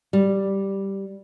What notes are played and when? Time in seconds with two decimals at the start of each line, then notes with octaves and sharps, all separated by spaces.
0.13 G3